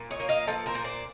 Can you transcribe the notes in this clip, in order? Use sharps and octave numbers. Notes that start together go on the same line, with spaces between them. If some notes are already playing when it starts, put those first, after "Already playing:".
Already playing: A#2
C#5 D#5
A#3
D#5 F5
F3 A4 B4
A#4 C5
A#2
C5 D5